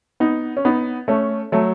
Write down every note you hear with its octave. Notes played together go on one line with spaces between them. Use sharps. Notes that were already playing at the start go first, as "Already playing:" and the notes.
B3 D#4
C#4
B3 D#4
A3 C#4
F#3 A3